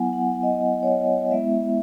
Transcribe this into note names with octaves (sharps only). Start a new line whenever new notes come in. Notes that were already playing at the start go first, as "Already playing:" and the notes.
Already playing: F#3 B3 E4 F#5 G#5
F#5
D#5
C#5
D#5
G#3 B3 E4 E5